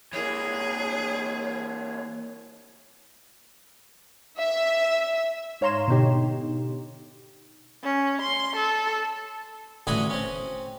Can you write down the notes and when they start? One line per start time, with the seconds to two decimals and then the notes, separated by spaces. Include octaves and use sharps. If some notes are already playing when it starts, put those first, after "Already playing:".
0.13 E3 A#3 G#4 C#5
4.38 E5
5.61 G#2 C#5 F5 A#5 C6 E7
5.88 B2 D3 D#4 G4
7.84 C#4
8.22 C6
8.56 A4
9.87 A1 D3 F#4 G#4 G#5 B5
10.10 C4 C#4